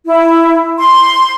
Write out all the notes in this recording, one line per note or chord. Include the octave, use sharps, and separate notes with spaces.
E4
C6